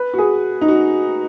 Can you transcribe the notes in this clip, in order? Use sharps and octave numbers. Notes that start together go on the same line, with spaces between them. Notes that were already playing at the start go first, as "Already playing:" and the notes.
Already playing: B4
F#4
G#4
D#4
F#4